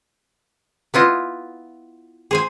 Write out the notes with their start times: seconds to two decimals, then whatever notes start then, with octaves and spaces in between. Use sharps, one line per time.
0.94 B3 E4 F4 D#5
2.31 G#4 C5 G#5